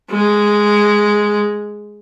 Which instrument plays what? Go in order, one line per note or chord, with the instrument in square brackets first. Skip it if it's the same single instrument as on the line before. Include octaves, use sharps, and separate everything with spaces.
[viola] G#3